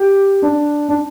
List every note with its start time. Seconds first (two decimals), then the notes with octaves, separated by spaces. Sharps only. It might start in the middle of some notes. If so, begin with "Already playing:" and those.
Already playing: G4
0.42 D4
0.89 D4